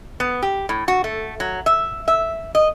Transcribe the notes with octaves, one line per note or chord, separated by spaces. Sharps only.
B3
G4
A2
F#4
A3
F#3
E5
E5
D#5